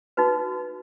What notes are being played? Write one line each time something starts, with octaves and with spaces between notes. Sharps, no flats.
D#4 F#4 B4